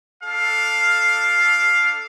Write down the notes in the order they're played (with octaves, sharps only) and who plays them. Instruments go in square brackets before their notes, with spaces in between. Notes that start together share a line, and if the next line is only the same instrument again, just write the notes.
[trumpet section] D4 A4 F5